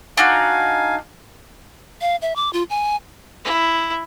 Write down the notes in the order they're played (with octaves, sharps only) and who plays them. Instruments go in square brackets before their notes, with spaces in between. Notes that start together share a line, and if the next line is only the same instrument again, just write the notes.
[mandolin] D4 D#4 F#4 [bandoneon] F5 G#5
[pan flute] F5
E5
D6
F4
G#5
[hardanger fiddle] E4